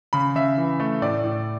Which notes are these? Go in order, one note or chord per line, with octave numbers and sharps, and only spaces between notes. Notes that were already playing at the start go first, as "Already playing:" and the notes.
C#3 B5
C#3 E5
E3
A3
A2 D5
A2